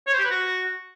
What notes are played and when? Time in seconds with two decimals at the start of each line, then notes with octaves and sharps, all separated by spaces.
0.07 C#5
0.13 C5
0.19 G4
0.25 B4
0.31 F#4